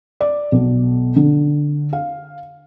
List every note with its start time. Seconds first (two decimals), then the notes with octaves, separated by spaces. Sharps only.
0.20 D5
0.52 B1
1.16 D3
1.93 F5